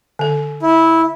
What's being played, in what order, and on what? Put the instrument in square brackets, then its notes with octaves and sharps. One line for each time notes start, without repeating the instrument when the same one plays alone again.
[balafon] D3 A4
[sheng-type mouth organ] E4